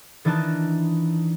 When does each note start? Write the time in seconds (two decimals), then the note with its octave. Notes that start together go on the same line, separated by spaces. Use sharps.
0.25 D#3 E3 D4 D#4 A5 F#6